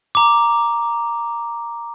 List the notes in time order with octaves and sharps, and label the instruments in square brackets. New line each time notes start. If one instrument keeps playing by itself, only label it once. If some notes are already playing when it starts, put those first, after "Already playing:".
[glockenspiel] A#5 D6